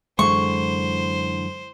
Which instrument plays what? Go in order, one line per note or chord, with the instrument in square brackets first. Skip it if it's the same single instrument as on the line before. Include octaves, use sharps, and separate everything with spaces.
[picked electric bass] F#2 G#3 [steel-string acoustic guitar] D3 E3 [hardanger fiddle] C5 [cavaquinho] C#6